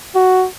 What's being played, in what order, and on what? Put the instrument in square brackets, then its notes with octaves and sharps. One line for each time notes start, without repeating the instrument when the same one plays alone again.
[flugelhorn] F#4